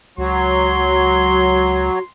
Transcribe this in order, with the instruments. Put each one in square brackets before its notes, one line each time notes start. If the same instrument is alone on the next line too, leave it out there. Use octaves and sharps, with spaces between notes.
[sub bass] C#2 [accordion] F#3 [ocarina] F#4 [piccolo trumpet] C6